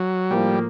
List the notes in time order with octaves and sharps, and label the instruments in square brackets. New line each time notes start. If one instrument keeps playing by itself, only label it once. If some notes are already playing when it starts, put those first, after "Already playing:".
Already playing: [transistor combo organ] F#3
[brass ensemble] A2 F3 A#3 [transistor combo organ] G3